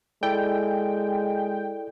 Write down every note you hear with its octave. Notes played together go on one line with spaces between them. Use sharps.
G#3 E4 A4 D5 G5